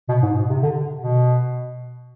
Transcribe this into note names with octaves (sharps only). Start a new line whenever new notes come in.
B2
G#2
B2
C3
D3
B2